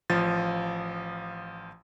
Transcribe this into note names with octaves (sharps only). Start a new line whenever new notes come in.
A1 F3 F5 A6